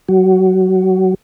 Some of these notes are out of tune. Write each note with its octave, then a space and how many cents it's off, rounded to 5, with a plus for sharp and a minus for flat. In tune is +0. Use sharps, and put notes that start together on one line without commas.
F#3 +20